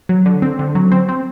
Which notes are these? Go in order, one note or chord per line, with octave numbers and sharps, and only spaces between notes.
F#3
D3
C4
D3
F#3
C4
C4